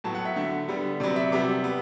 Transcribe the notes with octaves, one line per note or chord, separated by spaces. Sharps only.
A2 F#3 B3 A5
F#5
E5
D3 A3
D3 G3 B3
C3 F#3 B3 D5
E5
C3 G3 B3 D6
B3